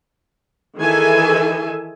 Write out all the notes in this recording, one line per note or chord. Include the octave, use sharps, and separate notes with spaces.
D#3 E3 G#4 A4 E5 G#5